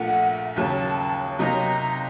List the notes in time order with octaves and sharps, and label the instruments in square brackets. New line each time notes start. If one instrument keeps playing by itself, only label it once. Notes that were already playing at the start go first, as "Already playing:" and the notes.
Already playing: [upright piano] A#1 A#2 A3 [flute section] F#5
[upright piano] D#2 C#3 F#3 [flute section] A5
[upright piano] C3 F#3 A#3 D#4 [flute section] A#5